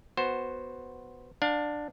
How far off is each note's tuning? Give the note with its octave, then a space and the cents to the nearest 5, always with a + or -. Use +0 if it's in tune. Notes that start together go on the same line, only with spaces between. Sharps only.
B3 +0 F#4 +0 C5 +10
D4 +10 F5 +35